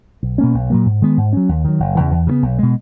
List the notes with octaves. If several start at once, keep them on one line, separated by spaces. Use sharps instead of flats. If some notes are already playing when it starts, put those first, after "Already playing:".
B1
B2 A#3 C#4
B1
A#2 F#3 A#3
G#2
D#3 G#3 B3
G#2
F#3 C#4
D#2
D#3 F#3
F#1
E2 C#3 E3
E2
C#3 F#3 B3
B1
B2 G#3